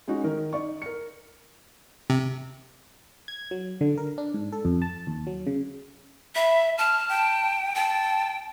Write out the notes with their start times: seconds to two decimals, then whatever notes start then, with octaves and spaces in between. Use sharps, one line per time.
0.08 G#3 C#4 D#4 F#4
0.24 D#3 A#4
0.53 D#4 D5 C#6
0.82 A#4 C#7
2.10 C3
3.28 G#6
3.51 F#3
3.81 D3
3.98 A#4
4.18 D4
4.34 G#2
4.52 A4
4.65 F2
4.82 A5
5.07 D#2
5.27 F#3
5.47 C#3
6.35 E5 B5
6.78 A5 F6
7.09 G5
7.75 G5 A5